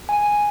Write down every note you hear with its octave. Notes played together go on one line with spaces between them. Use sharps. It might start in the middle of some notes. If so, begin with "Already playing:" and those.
G#5